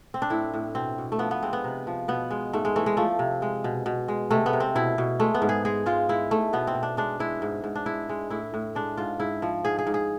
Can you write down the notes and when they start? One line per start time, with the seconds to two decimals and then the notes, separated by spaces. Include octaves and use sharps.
0.14 C4
0.22 D4
0.30 A2 E4
0.54 A2
0.75 B2 C4
0.98 B2
1.12 A3
1.19 F3 B3
1.31 B3
1.42 G#3 C4
1.53 B3
1.64 C3
1.87 F3
2.08 B2 B3
2.31 G#3
2.53 G#2 A3
2.65 G#3
2.76 E3 A3
2.86 G#3
2.97 F3 A3
3.19 C3
3.42 G#3
3.64 B2
3.86 B2
4.08 G#3
4.31 C3 A3
4.46 B3
4.53 C3
4.60 C4
4.75 B2 E4
4.98 B2
5.20 G#3 A3
5.34 B3
5.42 G#2
5.49 G#4
5.65 G#3 G#4
5.86 G#3 F4
6.09 G#3 E4
6.31 G#2 A3
6.53 B2 B3
6.67 C4
6.75 B2
6.83 D4
6.97 G#3 D4
7.19 G#3 E4
7.42 G#2
7.64 G#2
7.75 D4
7.86 G#3 E4
8.09 G#3
8.30 A2 E4
8.54 A2
8.75 G#3 D4
8.97 G#2 F4
9.20 G#2 E4
9.42 F3
9.65 G#2 G#4
9.79 G#4
9.87 G#2
9.94 G#4